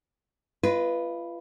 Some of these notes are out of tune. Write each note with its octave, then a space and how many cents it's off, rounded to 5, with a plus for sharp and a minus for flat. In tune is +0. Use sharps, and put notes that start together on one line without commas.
F4 -30 B4 +0 D#5 +0